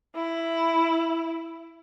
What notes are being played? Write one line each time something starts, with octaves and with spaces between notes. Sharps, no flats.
E4